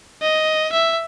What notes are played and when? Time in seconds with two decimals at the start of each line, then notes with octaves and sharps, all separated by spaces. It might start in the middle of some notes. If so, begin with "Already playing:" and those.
0.22 D#5
0.72 E5